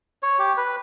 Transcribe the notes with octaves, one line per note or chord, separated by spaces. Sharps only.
C#5
G4
B4